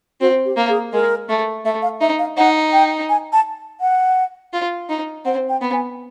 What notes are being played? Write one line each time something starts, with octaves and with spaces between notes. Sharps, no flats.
C4 F#4
G4
A#3
G#4
G#3 A#4
A3
A3 E5
F5
D#4 E5
F5
D#4 F#5
G5
G#5
A5
F#5
F4
D#4
C4 F#5
G5
B3
G#5